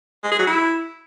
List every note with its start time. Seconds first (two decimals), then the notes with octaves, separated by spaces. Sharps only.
0.24 G#3
0.32 G#4
0.39 F#3
0.47 E4